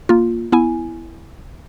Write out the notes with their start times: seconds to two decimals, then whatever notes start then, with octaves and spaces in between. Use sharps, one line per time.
0.09 A#3 F4
0.52 B3 E4 G#5